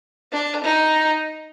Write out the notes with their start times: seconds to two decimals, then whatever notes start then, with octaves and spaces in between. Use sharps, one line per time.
0.32 D4
0.64 D#4